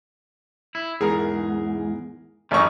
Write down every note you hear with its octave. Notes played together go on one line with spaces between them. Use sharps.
E4
E2 G#2 G#4 A#4
A1 F#2 D#3 D#4 C#6